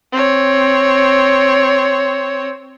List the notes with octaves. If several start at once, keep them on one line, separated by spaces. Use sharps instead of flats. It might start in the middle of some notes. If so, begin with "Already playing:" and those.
C4 C#5